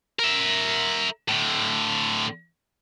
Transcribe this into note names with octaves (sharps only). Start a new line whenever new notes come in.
A#4 E5
A2 D3